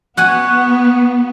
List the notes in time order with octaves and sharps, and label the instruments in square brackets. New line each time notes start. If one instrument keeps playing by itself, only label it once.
[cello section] B3 [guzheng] F#4 F#5 G#5